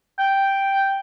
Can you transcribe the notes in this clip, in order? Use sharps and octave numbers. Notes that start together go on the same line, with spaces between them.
G5